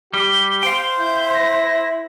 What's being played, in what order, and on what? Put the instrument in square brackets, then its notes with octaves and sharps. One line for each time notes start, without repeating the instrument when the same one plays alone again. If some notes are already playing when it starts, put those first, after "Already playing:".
[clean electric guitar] G3 [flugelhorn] G4 [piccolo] G7
[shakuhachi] C5 [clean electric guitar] F5 G5
[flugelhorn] E4 [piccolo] G6
[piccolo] A#6